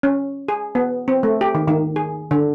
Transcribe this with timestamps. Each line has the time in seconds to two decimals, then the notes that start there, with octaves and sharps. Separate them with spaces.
0.03 C#4
0.48 G#4
0.75 B3
1.08 C4
1.23 A3
1.41 G4
1.55 D#3
1.68 D#3
1.96 G#4
2.31 D3